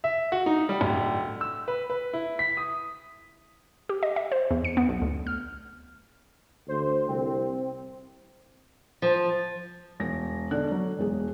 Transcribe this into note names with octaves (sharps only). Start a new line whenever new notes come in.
E5
F#4
D#4
G3
D1
E6
B4
B4
E4
B6
D#6
G4
D#5
E5
C5
E2
C#7
B3
B1
D2
F6
D2 C5
C2 C4
F3
E1 A#6
B2 D3 D5 F#6
F#3
E1 G#3